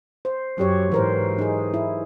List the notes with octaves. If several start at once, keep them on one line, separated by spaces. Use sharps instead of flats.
C5
F#2 F#3 G4 C#5
G#2 E3 A#4 C5
D#4 G#4
E4